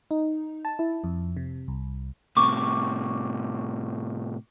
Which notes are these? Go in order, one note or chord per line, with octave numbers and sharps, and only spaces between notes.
D#4
A5
E4
F2
C3
C2
A2 C3 C#6 D6